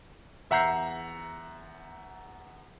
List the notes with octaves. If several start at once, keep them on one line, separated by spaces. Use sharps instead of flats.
E2 E5 F#5 A#5 G6 C7